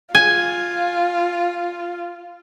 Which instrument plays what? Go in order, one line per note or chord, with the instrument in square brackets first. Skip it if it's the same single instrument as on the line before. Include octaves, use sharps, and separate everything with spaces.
[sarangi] F4 [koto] G#5